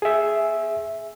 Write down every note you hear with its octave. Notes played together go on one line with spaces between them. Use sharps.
G#4 E5